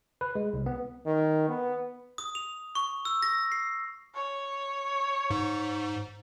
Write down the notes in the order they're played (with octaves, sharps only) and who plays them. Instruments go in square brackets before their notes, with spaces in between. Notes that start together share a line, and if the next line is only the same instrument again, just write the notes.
[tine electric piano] B4
G#3
C2
B3
[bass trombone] D#3
B3
[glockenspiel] D#6
F7
C#6
E6
A#6
C7
[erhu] C#5
[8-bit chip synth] G#2